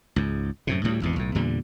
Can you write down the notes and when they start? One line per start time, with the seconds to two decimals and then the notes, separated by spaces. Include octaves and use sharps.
0.16 C#2 G#2
0.67 F#2 A2 C3
0.84 D2 A2 G3
1.02 G#1 E2 B2
1.16 B1 A2
1.35 E2 A#2 D3 G3